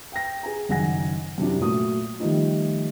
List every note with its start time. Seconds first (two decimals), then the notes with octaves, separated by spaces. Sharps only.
0.12 G5 A#6
0.43 G#4 G#5 A#5
0.69 F#1 F#2 D#3 F#5 G#5 A#6
1.38 F#2 C3 G3 D4 E4
1.60 A#2 F#3 A3 A#3 D#6
2.20 D#3 F3 G3 A3 D#4 F4